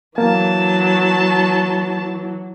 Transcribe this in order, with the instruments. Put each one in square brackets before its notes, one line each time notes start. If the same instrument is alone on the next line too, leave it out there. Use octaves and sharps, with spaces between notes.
[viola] E3 F#3 [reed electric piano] A#3 [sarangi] A5